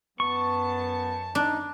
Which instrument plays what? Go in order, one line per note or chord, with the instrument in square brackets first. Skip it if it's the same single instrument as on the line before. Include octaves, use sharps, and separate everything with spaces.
[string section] F#2 A5 [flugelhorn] B3 [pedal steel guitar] C#6
[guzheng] D4 [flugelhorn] D#4